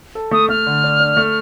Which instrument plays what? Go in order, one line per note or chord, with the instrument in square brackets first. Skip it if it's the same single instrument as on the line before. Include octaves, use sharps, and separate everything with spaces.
[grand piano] A4
[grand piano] A3 [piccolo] D#6
[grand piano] A3 [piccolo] F6
[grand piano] D3
D4
D4
A3